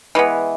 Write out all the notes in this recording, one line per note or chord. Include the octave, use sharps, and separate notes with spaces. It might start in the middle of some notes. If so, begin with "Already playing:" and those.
E3 G#3 B3